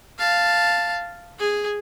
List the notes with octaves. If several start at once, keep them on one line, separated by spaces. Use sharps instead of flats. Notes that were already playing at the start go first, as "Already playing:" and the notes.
F5 A5
G#4